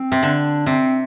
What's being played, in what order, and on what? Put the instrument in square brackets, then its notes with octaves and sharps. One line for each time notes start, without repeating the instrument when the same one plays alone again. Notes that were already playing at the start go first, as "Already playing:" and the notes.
Already playing: [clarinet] C4
[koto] C3
[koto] D3 [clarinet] D4
[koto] C3 [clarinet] C4